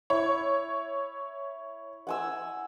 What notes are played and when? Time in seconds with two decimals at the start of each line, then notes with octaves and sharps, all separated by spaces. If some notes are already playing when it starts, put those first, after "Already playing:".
0.10 E4 C#5
2.07 F#5 G#5 E6